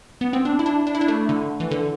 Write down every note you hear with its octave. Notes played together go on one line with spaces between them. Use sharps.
B3
C4
D4
E4
D4
D4
E4
D4
A3
D3
E3
D3